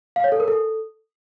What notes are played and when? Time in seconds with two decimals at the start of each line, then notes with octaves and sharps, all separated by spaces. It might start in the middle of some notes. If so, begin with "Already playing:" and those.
0.16 F5
0.24 C#5
0.32 A4
0.40 A#4
0.48 A4